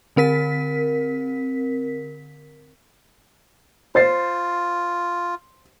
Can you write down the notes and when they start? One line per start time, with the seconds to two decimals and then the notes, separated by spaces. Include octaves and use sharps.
0.16 D3 C4 A#4 B6
3.95 F4 C5 A6 C7